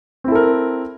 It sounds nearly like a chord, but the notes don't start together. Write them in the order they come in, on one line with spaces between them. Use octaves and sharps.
C4 E4 A4 A#4